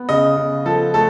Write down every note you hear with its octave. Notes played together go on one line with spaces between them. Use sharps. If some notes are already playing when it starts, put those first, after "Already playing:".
Already playing: B3
C#3 D#5
C#3
F3 A4
A3 A4